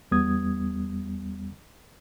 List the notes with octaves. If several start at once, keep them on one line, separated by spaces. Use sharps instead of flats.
E2 G3 B3 D#6 G#6